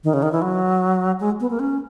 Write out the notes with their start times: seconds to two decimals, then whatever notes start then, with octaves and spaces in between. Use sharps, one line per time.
0.04 D#3
0.14 C#3
0.23 D#3
0.32 E3
0.42 F#3
1.20 G#3
1.40 B3
1.50 A#3
1.59 C#4